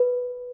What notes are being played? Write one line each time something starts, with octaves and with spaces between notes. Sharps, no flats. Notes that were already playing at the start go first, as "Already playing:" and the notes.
Already playing: B4